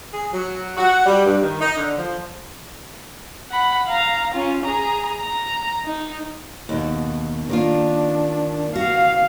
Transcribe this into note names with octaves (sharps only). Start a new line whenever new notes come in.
G#4
F#3
F#4
G3
G2
D#3
D#4
D3
F3
F#5 B5
F5 A#5
C#4 F4
G#4 A#5
A#5
D#4
D#2 B2
D#3 A#3 D4 F4
F#4 F5